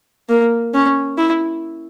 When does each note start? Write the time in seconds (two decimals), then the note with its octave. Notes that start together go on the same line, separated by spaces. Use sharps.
0.29 A#3
0.74 C#4
1.18 E4